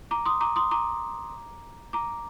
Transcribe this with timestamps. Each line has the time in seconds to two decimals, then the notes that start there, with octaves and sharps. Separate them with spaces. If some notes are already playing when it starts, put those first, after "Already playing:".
0.11 A#5 D6
0.26 C6 D#6
0.41 A#5 D6
0.56 C6 D#6
0.71 A#5 D6
1.93 A#5 D6